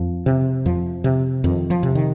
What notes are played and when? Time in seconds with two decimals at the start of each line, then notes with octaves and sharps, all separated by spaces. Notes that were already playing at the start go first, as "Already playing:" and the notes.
Already playing: F2 F3
0.26 C3
0.66 F2 F3
1.04 C3
1.44 F2 D#3
1.70 F3
1.83 C3
1.95 D#3